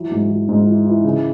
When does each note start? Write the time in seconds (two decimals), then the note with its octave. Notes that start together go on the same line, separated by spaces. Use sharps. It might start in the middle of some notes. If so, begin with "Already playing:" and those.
Already playing: E3 F#3
0.11 G#2
0.30 E3
0.49 G#2
0.67 E3
0.86 E3
1.04 C#3